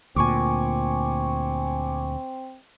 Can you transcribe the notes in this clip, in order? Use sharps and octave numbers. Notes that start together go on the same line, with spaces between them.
D2 A#2 C4 G#5 C#6 D6